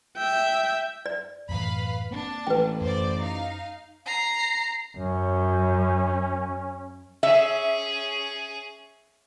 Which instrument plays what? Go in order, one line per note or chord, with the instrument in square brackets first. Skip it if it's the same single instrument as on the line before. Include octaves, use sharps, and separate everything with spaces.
[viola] E5 G5
[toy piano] D5
[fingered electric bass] F#2 A2 E3 [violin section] B4 F5 B5
[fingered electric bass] A#3 C4 [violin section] D4 A5
[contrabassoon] A1 [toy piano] B4 G5
[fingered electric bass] F#2 [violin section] C5 D5
[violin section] D#4 F5
[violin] A#5 C7
[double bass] F#2 [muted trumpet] C#4
[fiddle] C#4 G#4 [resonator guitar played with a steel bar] E5